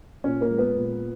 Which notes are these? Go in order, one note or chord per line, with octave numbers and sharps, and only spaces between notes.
A#2 C#4 C#5
A#3 A#4
G#3
B3 B4
A#2